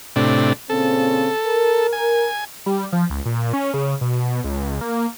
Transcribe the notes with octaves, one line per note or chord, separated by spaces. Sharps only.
A2 C3 D4
A#2 C#3 C4 A4
A#4
G#5
G3
F3
C#2
A#2
C#4
C#3
B2
C#2
A#3